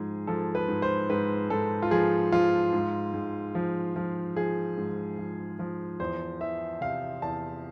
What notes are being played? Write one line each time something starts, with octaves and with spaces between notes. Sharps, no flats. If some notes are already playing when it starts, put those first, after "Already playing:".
Already playing: G#2 F3 G#4
F3 A4
B4
G#2
C5
G#2 B4
G#2 A4
F4
F3 G#4
F3 F4
G#2
G#2
F3
F3
F3 G#4
G#2
F3
F3
E2 C5
E3 E5
C3 F5
E2 A5